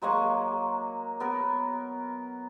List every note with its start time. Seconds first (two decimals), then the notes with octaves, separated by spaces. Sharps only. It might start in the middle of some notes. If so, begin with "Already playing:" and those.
0.02 F#3 G#3 A#3 C#6
1.20 B3 A#4